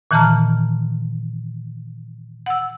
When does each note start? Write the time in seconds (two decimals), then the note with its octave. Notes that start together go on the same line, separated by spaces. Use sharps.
0.11 A#2 D#3 E3 A5 A#5 F6
2.46 F#5 E6